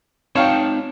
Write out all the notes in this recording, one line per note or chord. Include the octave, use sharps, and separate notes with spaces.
C4 D#4 C#5 F5 G5 A5